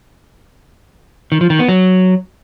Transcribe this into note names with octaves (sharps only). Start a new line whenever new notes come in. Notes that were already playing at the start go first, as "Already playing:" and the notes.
D#3
F3
D#3
B3
F#3